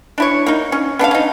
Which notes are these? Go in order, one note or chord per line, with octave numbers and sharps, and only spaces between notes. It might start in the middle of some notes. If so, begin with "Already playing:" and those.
D4 E4 C#5
A#3 D#4
C#4
B3 D4 A4 F5
C#4 D#4